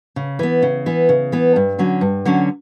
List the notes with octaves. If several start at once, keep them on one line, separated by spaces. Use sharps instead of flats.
C#3
E3 B3
C#3
E3 B3
C#3
E3 B3
G2
D3 F#3 C#4
G2
D3 F#3 C#4